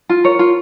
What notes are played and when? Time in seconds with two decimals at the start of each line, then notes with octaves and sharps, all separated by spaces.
0.09 F4
0.24 A#4 C#5
0.39 F4